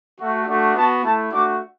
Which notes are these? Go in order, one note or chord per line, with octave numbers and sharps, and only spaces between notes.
A3 F#4
A3 D4 F#4
B3 F#4 A5
A3 E4 A5
A3 D4 F#4 D6